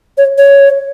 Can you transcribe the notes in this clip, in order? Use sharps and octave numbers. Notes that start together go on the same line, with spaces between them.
C#5
C#5